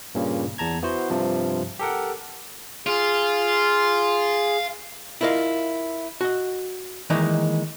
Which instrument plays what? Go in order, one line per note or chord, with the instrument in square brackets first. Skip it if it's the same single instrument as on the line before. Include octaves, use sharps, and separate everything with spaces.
[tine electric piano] G2 A#2 C#3
E2 A5 A#5 G#6
B3 E4 F#4 C5
G2 C3 F3
G4 A4 A#4 F#5
[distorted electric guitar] F4 [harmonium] G#4
[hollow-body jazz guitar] E4 F4 A#4 D#5 F5
F#4 D#5
D#3 E3 G#3 A#3 D#4